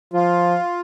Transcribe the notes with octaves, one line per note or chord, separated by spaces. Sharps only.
F3 F4